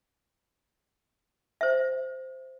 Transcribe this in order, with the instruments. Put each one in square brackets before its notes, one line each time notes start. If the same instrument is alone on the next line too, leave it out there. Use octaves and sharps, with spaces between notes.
[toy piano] C5 E5